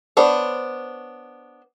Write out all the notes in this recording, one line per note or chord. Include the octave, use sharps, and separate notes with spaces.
B3 D4 C5 C#5